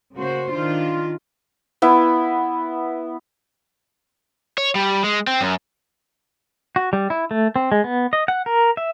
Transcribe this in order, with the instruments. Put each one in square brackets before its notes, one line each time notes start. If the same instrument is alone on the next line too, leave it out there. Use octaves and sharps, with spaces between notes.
[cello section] C#3 A#3 F#4 C5
D#3 D4 F4
[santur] B3 E4
[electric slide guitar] C#5
G3
G#3
C4
F#2
[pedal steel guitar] F#4
G3
E4
A3
C4
G#3
B3
D#5
F#5
A#4
E5